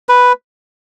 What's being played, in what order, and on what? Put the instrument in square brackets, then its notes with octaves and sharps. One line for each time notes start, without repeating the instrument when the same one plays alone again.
[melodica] B4